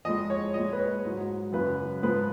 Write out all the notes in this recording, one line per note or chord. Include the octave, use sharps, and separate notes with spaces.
F2 F3 G#3 D#5
C#5
A#2 G#3 D#5
B4
C#5
G#2 F#3
F#2 C#3 F#3 B4
G#2 F3 G#3 B4